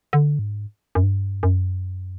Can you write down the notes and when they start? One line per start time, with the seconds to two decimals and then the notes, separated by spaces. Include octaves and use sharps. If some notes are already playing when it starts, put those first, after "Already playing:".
0.13 D3
0.39 G#2
0.95 F#2
1.03 G2
1.43 F#2